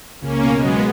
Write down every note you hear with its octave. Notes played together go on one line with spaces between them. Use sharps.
C#2 A#3 C#4
B2
G#3 B3
F#3